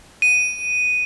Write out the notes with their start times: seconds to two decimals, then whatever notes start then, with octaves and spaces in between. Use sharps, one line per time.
0.22 D#7